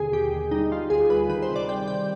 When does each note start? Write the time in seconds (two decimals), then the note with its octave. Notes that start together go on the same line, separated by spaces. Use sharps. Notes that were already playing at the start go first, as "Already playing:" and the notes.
Already playing: D#2 B2 D3 G#4
0.12 D#2 G4
0.32 D#2
0.51 G3 D#4
0.71 G3 F4
0.90 D2 G#4
1.10 G3 B4
1.29 D#3 B4
1.42 C5
1.49 C3
1.56 D5
1.68 G3 G5
1.88 C3 G5